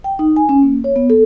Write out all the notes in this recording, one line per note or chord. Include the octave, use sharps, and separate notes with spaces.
G5
D#4
G#5
C#4
A#3
C#5
B3
A4